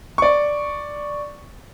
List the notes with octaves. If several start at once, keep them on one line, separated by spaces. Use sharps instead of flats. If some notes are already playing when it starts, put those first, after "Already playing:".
D5 C#6